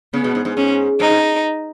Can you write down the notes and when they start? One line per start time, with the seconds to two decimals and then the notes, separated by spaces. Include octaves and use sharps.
0.13 C#3 B3
0.24 B2
0.35 G#2
0.45 G#2
0.56 G#2 C#4
1.00 G#2 D#4
1.10 G#2